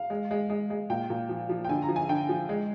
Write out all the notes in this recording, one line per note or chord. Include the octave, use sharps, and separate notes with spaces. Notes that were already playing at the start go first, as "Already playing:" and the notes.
Already playing: F5
G#3
G#3
G#3
G#3
A#2 G5
A#2
F3
F3
G5
D3 G#5
A#5
F3
G#5
D3 G5
F3
G#3